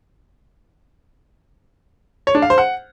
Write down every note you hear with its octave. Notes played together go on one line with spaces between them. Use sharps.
C#5
D4
F5
C5
F#5